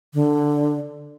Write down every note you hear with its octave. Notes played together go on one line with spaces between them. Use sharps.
D3